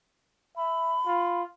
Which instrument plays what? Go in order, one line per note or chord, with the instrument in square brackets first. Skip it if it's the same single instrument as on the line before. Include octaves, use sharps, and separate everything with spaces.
[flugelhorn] E5 [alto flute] B5
[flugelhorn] F4